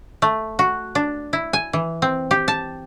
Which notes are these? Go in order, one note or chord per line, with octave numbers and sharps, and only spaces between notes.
A3
F#4
D4
E4
G#5
E3
C4
G4
A5